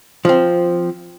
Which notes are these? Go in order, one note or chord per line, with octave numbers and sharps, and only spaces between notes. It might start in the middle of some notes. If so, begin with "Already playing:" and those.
F3 C4